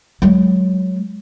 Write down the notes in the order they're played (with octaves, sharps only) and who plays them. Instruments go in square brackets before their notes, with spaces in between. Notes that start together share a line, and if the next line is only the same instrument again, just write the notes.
[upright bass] F#3 G#3